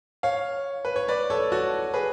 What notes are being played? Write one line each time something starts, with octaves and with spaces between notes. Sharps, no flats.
C#5 F5
B4
C#5
B4 D5
A4 C#5
F#4 A4
G#4 B4